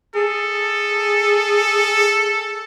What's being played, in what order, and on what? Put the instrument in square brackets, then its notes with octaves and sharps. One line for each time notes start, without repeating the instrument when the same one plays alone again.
[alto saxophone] G#4 [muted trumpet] A4